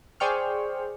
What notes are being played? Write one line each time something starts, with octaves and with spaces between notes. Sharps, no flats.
G#4 C5 D5 G5 C#6 F6